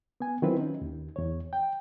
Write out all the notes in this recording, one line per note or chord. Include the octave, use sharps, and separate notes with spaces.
B3 G#5
D#3 F#3 C4 E4 F4 B4
C#4 D#4
D#2
E2 C#5
G5